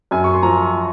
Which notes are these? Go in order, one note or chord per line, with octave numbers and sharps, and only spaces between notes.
F#2 G#5
C#6
C6
F3 A#5